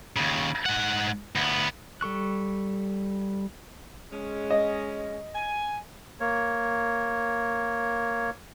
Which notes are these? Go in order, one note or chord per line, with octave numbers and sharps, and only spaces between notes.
D#2 C#3
G#2 F#5
D2 B3
G3 A4 C#6 F#6
G#3 C#4
D#5
G#5
A#3 C#5